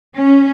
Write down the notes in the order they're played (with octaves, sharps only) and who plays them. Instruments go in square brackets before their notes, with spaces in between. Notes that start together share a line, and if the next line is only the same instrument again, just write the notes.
[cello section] C#4